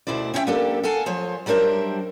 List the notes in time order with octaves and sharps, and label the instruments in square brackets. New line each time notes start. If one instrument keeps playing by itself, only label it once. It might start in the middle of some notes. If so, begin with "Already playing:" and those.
[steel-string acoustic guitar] D2 B2 E4 C5 D5
C4 C#4 E4 C#5 E5 G5
A#3 C4 D4 G4 A4
A4 F5 F#5 G#5 A5
F3 C5 C#5
F#3 G3 D4 A#4 C5 E5